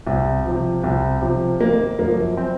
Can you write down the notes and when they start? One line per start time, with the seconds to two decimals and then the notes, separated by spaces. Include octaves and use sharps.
0.07 C2
0.46 C3 F3
0.84 C2
1.22 C3 F3
1.61 G#1 A#3
1.99 F#2 F3 A#3
2.37 C4